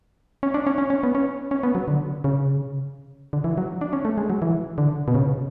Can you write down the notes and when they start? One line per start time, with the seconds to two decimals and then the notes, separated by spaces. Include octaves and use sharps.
0.43 C#4
0.54 D4
0.67 C#4
0.78 C#4
0.90 C#4
1.03 B3
1.15 C#4
1.51 C#4
1.63 B3
1.75 F#3
1.88 D3
2.24 C#3
3.33 D3
3.44 E3
3.58 F#3
3.81 D4
3.93 C#4
4.05 A3
4.18 G#3
4.30 F#3
4.42 E3
4.78 D3
5.08 B2
5.15 C#3